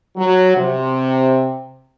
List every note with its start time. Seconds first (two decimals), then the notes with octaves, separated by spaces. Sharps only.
0.16 F#3
0.57 C3